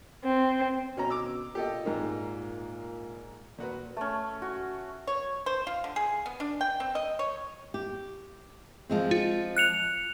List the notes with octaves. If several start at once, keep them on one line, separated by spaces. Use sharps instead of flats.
C4
B2 C#4 C#5 A#5
D6 E6
A#2 G4 A4 D#5
G#2 A#3 D#4
A#2 F#4 B4
A3 C#4
F#4
C#5
C5
F4
D3
G#4
B3
D4
G5
C4
D#5
C#5
G4
F3 G#3 C4
F4
F#6 C#7 F7